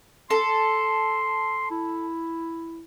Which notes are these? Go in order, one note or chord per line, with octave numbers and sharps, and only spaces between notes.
A4 C6
E4